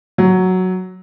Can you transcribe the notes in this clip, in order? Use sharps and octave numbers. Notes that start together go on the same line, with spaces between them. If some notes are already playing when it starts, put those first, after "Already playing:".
F#3